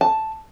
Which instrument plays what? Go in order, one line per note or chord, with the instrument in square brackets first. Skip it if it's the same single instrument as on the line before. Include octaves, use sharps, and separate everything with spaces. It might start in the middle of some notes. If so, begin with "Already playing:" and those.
[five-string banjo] A5